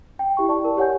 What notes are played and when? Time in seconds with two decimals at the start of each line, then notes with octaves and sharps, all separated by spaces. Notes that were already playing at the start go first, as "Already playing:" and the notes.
0.19 G5
0.37 E4 G4 E5 C#6
0.49 D5 A5 C#6
0.63 E4 A#4
0.77 G4 C#5 F#5 G#5 G6